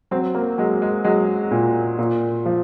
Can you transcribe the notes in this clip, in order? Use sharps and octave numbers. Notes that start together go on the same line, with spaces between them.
F#3 C4
A#3
F#3 G#3
G#3
F#3 G#3
A#2
A#2
F3